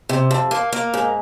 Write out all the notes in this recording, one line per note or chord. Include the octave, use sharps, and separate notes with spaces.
C3
F2
A#3
A#3
G#2